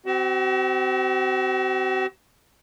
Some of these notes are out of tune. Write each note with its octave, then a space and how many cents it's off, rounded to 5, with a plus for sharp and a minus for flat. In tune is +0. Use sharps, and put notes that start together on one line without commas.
C4 -20 F#4 +40